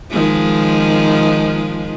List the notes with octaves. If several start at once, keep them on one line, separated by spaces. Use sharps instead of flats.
D#3 F3 G#3